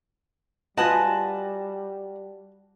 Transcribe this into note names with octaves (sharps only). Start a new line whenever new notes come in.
G3 F4 F#4 B4 D#5 F#5 G#5 A5